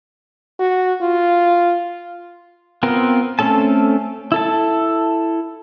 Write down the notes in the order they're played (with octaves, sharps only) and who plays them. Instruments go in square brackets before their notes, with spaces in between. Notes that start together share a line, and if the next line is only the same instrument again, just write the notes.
[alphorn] F#4
F4
[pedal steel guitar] B3 C4 F4 A#4
A3 C4 C#4 A4 A5
E4 A4 A5